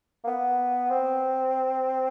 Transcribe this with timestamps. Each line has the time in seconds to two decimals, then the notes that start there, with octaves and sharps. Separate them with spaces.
0.24 A#3
0.27 B3
0.90 C4